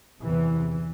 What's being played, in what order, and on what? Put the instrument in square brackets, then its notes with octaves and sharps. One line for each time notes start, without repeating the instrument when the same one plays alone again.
[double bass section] E2 C3 E3